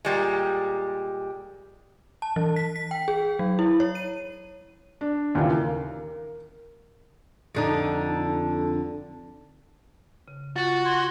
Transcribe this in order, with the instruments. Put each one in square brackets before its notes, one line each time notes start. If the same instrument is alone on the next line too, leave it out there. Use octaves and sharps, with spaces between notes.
[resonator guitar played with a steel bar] A#2 G3 G#3
[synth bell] A5
E3
B6
B6
G5
G#4
F#3
E4
C#5
D#7
[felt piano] D4
D#2 A#2 C#3 E3
A#4
[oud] F2 D3 D#4
[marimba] C#3
[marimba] F4 [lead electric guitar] F#4 [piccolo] A6
[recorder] C6 [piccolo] G#6